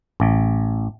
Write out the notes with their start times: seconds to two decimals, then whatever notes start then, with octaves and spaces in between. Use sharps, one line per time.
0.20 A1